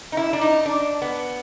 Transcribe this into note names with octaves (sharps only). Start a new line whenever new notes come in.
D#4
E4
D4
D#4
D4
B3